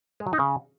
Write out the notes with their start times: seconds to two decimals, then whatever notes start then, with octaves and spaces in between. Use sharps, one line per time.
0.20 G#3
0.27 F#3
0.33 D#4
0.39 C#3